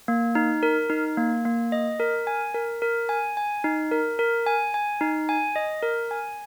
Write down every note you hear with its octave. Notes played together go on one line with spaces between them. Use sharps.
A#3
D#4
A#4
D#4
A#3
A#3
D#5
A#4
G#5
A#4
A#4
G#5
G#5
D#4
A#4
A#4
G#5
G#5
D#4
G#5
D#5
A#4
G#5